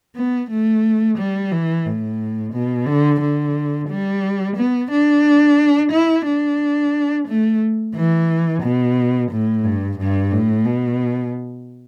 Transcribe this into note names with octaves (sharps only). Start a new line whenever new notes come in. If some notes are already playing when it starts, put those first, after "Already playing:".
B3
A3
G3
E3
A2
B2
D3
D3
G3
B3
D4
E4
D4
A3
E3
B2
A2
G2
G2
A2
B2